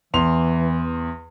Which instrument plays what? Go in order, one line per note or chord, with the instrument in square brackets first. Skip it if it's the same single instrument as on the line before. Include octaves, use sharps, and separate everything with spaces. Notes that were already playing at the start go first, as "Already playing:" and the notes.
[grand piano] E2 C6 F7 [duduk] E3